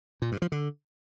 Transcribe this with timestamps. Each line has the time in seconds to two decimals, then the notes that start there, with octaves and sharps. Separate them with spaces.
0.22 A#2
0.32 G2
0.42 F3
0.52 D3